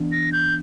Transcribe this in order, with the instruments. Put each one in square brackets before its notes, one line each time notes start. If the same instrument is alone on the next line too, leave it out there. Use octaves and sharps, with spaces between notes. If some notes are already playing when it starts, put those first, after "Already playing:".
Already playing: [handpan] E3 B3 D4
[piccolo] A#6
G6